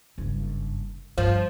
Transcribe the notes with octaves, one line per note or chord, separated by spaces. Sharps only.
F#1 G2
G2 F3